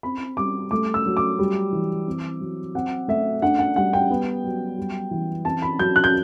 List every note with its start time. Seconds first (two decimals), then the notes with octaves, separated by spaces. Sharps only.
0.03 C4 B5
0.37 G3 D6
0.71 A3 D6
0.94 E6
1.06 F#3
1.17 D6
1.39 G3
1.72 E3
2.07 C4
2.40 F#3
2.75 C4 F#5
3.08 A3 E5
3.42 D4 F#5
3.59 F#5
3.76 G3 F#5
3.93 G5
4.10 B3
4.44 F#3
4.78 G3
5.11 E3
5.45 C4 A5
5.62 B5
5.79 F#3 G6
5.96 F#6
6.04 G6